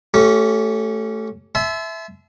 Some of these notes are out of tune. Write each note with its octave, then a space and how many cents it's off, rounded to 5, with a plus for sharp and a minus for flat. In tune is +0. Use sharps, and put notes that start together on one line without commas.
A3 +0 C#4 +0 G4 -30
E5 +0 A5 -40 C6 -35